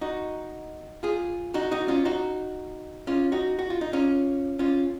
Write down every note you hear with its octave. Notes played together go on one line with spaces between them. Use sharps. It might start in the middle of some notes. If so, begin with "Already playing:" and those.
D#4 F#4
F4 G#4
D#4 F#4
D#4 F#4
C#4 F4
D#4 F#4
C#4 F4
D#4 F#4
F#4
F4
D#4
C#4 F4
C#4 F4